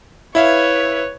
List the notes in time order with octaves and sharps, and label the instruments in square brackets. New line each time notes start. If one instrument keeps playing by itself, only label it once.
[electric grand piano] E4 E5 F5 [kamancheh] B4 C#5